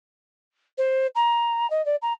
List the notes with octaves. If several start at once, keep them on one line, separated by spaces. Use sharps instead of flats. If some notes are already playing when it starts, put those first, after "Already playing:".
C5
A#5
D#5
D5
A#5